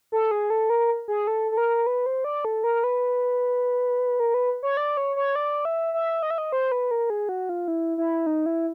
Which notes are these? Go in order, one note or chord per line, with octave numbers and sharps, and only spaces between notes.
A4
G#4
A4
A#4
G#4
A4
A4
A#4
B4
C5
D5
A4
A#4
B4
A#4
B4
C#5
D5
C#5
C#5
D5
E5
E5
D#5
E5
D#5
C5
B4
A#4
G#4
F#4
F4
E4
E4
D#4
E4